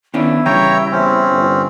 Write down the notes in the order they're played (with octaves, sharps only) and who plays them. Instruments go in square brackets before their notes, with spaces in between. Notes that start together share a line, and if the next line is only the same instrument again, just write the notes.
[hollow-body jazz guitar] D#3 C#4 D4 [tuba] B3 [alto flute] E4
[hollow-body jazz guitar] C#3 G3 [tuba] E3 [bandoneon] C#5 G5 A#5
[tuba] E2 [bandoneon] C4 C#4
[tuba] G1